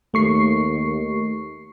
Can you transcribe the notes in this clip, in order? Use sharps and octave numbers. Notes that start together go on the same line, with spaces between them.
D#2 A3 C#6 C7